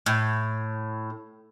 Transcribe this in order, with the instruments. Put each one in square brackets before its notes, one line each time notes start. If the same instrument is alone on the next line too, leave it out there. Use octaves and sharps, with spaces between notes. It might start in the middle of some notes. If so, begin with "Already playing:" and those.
[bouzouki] A2